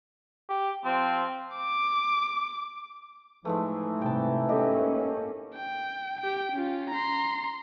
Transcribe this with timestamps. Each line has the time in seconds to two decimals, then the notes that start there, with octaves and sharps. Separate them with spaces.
0.49 G4
0.85 F3 C4
1.56 D6
3.45 A2 E3 F3 G#3 A3 D#4
4.02 G#2 C3 G3 G5 A5
4.49 A#3 C#4 G4 A4 D#5
5.55 G5
6.21 G4 G5
6.52 C#4 F4
6.91 A#5 C6